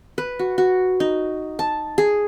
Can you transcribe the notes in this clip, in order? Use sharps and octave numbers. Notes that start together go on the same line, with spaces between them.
B4
F#4
F#4
D#4
A5
G#4